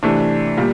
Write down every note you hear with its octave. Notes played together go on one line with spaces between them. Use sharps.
C3 E3 A3 D4
A#2 G3